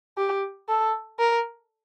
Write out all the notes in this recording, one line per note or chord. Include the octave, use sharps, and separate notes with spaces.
G4
A4
A#4